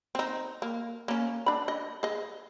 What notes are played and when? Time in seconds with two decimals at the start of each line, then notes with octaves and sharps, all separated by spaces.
0.15 C4 D#4
0.62 A#3
1.08 A#3 C#4
1.46 D4 B5
1.68 D#5
2.03 G#4 D#5